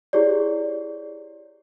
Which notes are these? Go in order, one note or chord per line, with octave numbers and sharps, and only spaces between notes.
E4 G4 G#4 C#5 D5